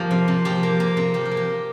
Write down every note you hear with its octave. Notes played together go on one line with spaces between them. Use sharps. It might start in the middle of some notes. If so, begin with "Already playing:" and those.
Already playing: F3 A#3 G4 A#4
C3
C3
F3 G4
A#3
A#3
C3
F3 G4
A#4
A#3
G4